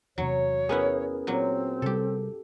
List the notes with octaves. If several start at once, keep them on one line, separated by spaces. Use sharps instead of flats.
E2 C3 F#3 C#5
B3 C#4 E4 G#4 A#4 B4
A#2 F#3 C4
C3 G3 G4 A4